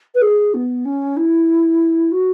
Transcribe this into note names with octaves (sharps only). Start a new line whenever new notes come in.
B4
G#4
B3
C#4
E4
F#4